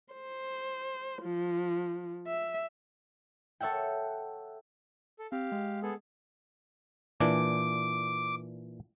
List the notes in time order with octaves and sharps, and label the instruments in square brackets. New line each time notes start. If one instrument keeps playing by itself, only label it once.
[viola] C5
F3
E5
[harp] A4 C#5 E5 F#5 G5
[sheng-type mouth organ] A4
[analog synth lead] C4 [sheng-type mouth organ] G4 F5
[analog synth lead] G#3
[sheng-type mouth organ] B3 G#4 A4
[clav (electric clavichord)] A#2 E3 D4 [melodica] D6